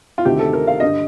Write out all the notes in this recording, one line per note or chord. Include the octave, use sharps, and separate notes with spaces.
F4
D2 C3 D#3 G4
A4
A#4
F5
G2 D3 D#5